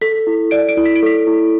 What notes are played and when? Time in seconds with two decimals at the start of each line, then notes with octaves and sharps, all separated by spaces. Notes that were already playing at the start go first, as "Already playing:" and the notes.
0.01 A4 B6
0.27 E4
0.51 D5 D7
0.69 D7
0.77 E4
0.86 B6
0.96 D7
1.03 A4 B6
1.27 E4